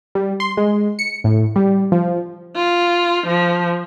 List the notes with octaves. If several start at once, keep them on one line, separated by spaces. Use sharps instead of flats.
G3
C6
G#3
C#7
A2
G3
F3
F4
F3